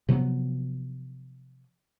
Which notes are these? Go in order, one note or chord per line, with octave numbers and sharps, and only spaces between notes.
C3 F3 F#3 B3